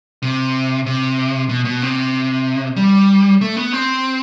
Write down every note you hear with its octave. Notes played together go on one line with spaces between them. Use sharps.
C3
C3
B2
B2
C3
G3
A3
B3
C4